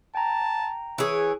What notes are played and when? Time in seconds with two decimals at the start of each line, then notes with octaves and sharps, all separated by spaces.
0.15 G5 A5 A#5
0.98 E3 G#4 C#5